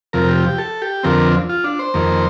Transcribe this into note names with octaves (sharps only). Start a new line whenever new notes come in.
F2 C3 F3 A#4
G4
G4
A4
G4
F2 D3 F3 C4 A#4
F4
D4
C5
F2 D#3 A#3